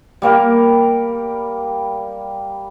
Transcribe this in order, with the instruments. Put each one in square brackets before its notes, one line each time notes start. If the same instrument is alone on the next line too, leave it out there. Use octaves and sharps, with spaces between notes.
[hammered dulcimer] G3 A#3 A#4